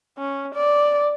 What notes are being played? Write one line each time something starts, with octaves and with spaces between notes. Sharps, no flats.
C#4
D5